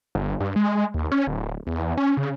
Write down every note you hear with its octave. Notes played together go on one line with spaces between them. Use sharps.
G1
G2
G#3
D#2
C#4
D1
E2
C#4
C#3